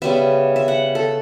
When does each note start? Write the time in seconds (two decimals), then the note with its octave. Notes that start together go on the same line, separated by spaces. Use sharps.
0.02 C#3 G3 B3 E5
0.56 E5
0.68 F#5
0.95 A4